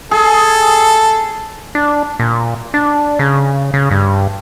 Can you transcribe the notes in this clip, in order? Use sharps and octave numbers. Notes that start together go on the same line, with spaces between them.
G#4 A4
D4
A#2
D4
C#3
C#3
G2